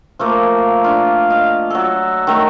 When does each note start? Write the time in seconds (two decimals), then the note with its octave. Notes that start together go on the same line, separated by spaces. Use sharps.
0.19 F3 A3 A#3
0.84 D4 F4
1.30 D#5 F5
1.70 F#3 A4
2.27 D#3 A3 A#5